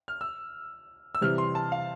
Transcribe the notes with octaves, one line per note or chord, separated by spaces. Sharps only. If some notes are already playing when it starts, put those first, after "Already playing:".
F6
E6
E6
C3 E3 G3 F6
C6
A5
F5